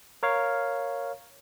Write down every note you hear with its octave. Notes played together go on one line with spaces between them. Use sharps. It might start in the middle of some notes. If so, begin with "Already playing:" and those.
A#4 C#5 F5